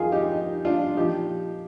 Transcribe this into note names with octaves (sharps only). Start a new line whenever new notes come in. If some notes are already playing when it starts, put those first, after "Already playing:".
Already playing: F2 D#3 F4 G#4
D#4 G4
D#4
D4 F4
A#2 F3 D#4 G4